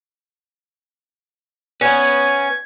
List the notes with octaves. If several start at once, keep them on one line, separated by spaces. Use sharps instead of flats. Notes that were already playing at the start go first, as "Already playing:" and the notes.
C#4 B4 F#5 G#6